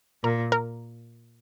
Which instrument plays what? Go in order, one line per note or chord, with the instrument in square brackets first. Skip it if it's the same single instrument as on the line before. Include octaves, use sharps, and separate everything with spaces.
[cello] A#2 [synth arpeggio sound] A#4
[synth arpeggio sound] A#4